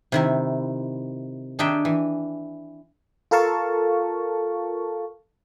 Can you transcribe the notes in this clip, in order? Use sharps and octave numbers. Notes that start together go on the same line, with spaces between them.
C3 D#3 E4
D#3 D4 D#4 G#4 E5 G5
E3
F4 A4 A#4 F5 A5 C#6